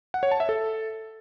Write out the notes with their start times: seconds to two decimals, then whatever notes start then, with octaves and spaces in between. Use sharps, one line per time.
0.14 F#5
0.23 C#5
0.31 A5
0.40 E5
0.49 A4